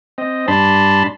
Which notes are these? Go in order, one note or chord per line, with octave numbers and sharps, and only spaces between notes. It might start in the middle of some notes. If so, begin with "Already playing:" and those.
C4 D#5
G2 D4 A5 B5 C6